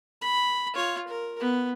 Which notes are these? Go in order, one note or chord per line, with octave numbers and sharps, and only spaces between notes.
B5
F4 C#5
A#4
B3